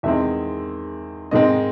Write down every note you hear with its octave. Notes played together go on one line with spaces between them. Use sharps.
E2 D#3 G#3 C4 E5
G#2 D#3 G#3 C4 D#5